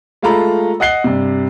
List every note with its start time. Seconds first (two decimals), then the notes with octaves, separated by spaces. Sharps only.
0.22 G#3 A3 F4 A4 A#5 B5
0.80 D#5 F#5 F#6 C7 G7
1.04 G2 C3